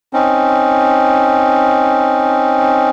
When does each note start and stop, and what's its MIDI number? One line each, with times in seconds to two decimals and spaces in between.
0.13 2.90 60
0.13 2.90 61
0.13 2.90 63